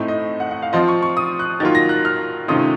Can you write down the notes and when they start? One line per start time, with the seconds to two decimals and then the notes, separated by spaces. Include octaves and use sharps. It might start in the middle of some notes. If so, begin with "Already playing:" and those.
Already playing: A2 A3 C4 D#4
0.08 D#5
0.40 F#5
0.51 F#5
0.62 F5
0.73 F3 C4 F4 D#5
0.88 C#6
1.02 C#6
1.17 D#6
1.39 F#6
1.60 D#3 F#3 A#3 F4 A6
1.75 A#6
1.89 F#6
2.05 F6
2.48 C3 D#3 A3 C#4 F4 D#6